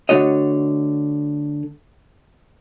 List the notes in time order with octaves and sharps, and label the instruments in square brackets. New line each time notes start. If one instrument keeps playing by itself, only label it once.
[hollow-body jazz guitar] D3 A3 F#4 C#5 D#5